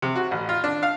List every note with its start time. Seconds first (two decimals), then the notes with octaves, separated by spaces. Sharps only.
0.02 C3
0.16 F#4
0.31 A1
0.49 F4
0.64 D4
0.83 F5